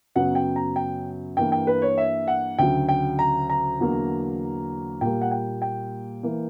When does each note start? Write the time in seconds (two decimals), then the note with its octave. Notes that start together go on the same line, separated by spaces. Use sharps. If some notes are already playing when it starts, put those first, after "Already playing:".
0.15 F#2 C#3 F#3 B3 F#5
0.35 G5
0.56 A#5
0.76 G5
1.36 G2 E3 A#3 G5
1.52 G5
1.67 B4
1.82 C#5
1.98 E5
2.28 F#5
2.59 D2 C#3 F#3 G5
2.89 G5
3.19 A#5
3.50 A#5
3.80 E2 D3 F#3 A#3
5.01 A#2 G3 A#3 G5
5.22 F#5
5.31 G5
5.62 G5
6.23 E3 A#3